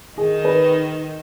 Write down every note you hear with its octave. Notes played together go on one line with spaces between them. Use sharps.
D#3 D#4 G#4
B4